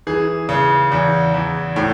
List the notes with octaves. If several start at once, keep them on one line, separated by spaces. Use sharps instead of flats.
E3 G#4
C#3
E2
E2
A2